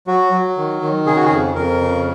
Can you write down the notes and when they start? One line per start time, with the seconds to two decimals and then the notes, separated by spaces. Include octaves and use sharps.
0.07 F#3 F#4
0.32 F#3
0.57 D#3
0.82 D#3
1.06 C#3 G#4
1.16 F#4
1.25 G#4
1.31 F2
1.55 F2 A#4
1.81 C#3